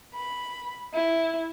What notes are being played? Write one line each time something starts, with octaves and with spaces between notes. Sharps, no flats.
B5
E4